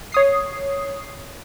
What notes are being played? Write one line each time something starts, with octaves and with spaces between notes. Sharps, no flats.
C#5 D#6 C7